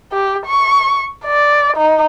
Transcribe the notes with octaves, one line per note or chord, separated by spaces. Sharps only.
G4
C#6
D5
D#4